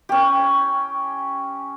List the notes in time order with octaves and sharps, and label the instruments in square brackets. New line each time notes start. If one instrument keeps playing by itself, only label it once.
[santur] C#4 G4